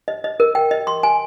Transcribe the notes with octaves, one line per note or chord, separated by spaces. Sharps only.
D#5
D#5
A#4
G5
D#5
C6
G#5